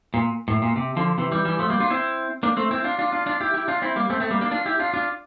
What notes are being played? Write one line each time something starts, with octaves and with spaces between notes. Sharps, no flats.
A#2
A2
A#2
C3
D3 F3
C3 E3
E3 G3
E3 G3
F3 A3
G3 A#3
D4 F4
C4 E4
A#3 D4
A3 C4
C4 E4
D4 F4
D4 F4
D4 F4
D4 F4
E4 G4
E4 G4
D4 F4
C4 E4
G3 A#3
A3 C4
A3 C4
G3 A#3
A#3 D4
D4 F4
E4 G4
D4 F4
D4 F4